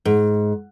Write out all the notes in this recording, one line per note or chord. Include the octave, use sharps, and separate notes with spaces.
G#2